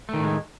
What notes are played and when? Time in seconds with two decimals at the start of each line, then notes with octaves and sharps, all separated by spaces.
0.09 A3
0.14 D#3
0.18 A2
0.23 G#3